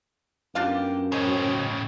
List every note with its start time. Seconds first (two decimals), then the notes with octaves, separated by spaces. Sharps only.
0.55 F#2 A#3 B3 D4 F4 G4 F5
1.12 A2 C#3 C4 G#4 C#5 D#5